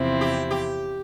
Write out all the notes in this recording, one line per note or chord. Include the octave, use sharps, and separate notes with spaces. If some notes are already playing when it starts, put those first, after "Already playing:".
Already playing: E2 C3 F3 C4 E4
G4
G4